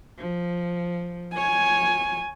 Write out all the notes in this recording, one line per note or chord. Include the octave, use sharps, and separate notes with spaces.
F3
C#5 G#5